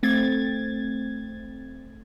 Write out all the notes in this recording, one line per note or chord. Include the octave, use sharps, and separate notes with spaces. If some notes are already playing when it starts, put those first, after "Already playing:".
A3 C4 G#6 A6